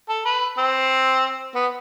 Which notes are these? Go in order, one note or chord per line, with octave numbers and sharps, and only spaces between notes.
A4
B4
C4
B3